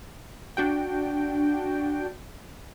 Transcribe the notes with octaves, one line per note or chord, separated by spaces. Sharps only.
D4 F#4 G5